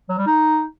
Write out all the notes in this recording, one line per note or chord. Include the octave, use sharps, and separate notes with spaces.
F#3
G3
D#4